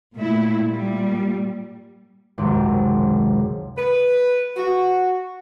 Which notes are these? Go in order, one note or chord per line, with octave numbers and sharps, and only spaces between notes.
A#2 A3 E4
A#2 G3
G#1 C#2 F#2 C3
B4
F#4